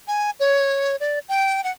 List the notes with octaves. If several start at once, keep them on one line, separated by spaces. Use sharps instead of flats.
G#5
C#5
D5
G5
F#5